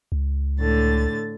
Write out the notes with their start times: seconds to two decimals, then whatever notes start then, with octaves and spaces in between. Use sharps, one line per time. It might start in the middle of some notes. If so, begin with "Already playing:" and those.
0.12 C#2
0.59 A2 D3 A6